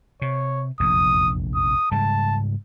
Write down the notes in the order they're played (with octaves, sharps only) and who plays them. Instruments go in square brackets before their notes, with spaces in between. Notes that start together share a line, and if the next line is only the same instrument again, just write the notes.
[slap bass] C3 [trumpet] C#5
[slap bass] F1 A#1 E2 [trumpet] D#6
[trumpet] D#6
[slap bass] G#2 C#3 G3 [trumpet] A5